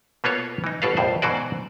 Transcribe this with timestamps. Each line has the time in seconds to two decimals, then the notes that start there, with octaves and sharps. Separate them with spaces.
0.24 B2 A#3 B3 F4 A4 C#5
0.64 E3 D#4
0.82 G1 B2 D4 A4 B4 F5
0.97 A#1 F2 A2 C5
1.22 G#2 B2 E3 F#4 C5 D5